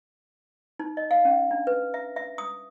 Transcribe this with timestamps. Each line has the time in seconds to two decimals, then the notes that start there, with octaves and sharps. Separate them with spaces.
0.79 D#4
0.97 D#5
1.11 F5
1.25 C#4
1.51 D4
1.67 B4
1.94 E5
2.16 E5
2.38 D#6